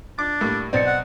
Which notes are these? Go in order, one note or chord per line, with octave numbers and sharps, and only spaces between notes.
D4 D6
A2 G3 A#3
B1 C4 D5 A6 C#7
F#5